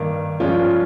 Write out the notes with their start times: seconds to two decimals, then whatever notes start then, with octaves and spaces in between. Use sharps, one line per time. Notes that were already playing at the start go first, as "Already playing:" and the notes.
Already playing: G2 D#3 A#3
0.40 G2 F3 G#3 C#4 F4